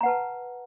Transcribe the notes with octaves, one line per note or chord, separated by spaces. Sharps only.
B4 F#5 A5 A#5